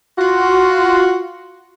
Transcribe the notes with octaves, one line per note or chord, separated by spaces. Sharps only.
F4 F#4